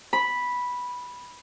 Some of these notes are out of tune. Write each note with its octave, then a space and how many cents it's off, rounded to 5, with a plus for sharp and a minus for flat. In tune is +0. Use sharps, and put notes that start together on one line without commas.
B5 -5